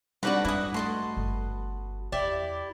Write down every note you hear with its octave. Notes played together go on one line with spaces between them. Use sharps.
G3 C4 D4 D#4 F#4 B4 D5 F#5
G#2 E4 D#6
A3 A4 D#5 C6
G1
E2 E4 G4 D5